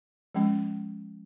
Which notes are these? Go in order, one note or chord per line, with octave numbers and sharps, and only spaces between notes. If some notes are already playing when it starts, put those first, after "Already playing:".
F3 G#3 C#4